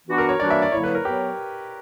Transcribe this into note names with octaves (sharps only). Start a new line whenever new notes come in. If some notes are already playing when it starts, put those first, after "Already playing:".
E3 B3 D4 F#4
A#4
C#5
E3 G3 A#3 D4 F#4 D5
E5
D5
D3 F#3 A#3 E4 C#5
B4
A#4
F#3 B3 G4